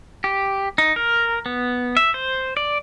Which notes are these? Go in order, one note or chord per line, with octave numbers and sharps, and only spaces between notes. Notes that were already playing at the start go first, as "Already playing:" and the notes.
G4
D#4
A#4
B3
E5
C5
D5